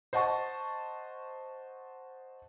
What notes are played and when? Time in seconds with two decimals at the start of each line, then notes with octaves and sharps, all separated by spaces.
0.13 C5 D#5 F#5 A5 C#6